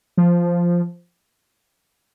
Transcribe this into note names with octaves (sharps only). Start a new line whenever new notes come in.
F3